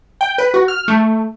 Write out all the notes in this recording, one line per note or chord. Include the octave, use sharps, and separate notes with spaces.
G5
B4
F#4
F6
A3